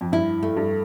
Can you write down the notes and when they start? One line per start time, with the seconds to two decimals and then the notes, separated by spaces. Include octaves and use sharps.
0.01 F2
0.12 G2 E4
0.43 A3
0.57 G2